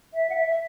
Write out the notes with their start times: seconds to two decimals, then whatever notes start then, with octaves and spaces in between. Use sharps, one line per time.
0.14 E5
0.30 F#5
0.35 E5
0.48 E5